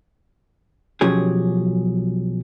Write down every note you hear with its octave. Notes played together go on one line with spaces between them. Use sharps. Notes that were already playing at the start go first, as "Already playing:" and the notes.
B1 F3 F#3 C#4 G4 G#4